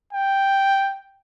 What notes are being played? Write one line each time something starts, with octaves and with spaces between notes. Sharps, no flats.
G5